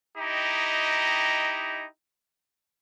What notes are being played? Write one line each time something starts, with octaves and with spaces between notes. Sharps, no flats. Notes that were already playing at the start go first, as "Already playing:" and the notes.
D#4 E4 G4 D#5 G5 A#5